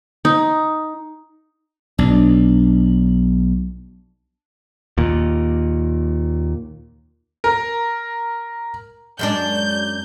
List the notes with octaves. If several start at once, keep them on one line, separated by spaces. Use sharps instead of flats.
D#4
B1 D4
D#2 A#2
A#4
F#2 G#3 D4 G6